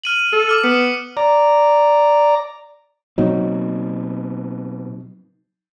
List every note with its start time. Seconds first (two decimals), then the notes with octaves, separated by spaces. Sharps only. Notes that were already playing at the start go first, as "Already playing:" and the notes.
0.04 F6 D#7 F#7
0.32 A4
0.49 D6 F6
0.64 B3 C#7
1.17 D5 A#5
3.18 B2 F#3 A#3 C4 D#4